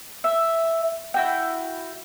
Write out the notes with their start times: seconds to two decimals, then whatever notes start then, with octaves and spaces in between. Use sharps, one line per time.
0.24 E5
1.14 E4 F#4 G5